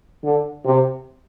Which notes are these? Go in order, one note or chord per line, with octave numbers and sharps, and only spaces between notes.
D3
C3